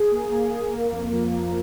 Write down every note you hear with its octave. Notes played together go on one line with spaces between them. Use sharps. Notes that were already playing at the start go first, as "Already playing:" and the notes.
Already playing: G#4
A#3
A#3
A#3
A#3
F2
F3
F3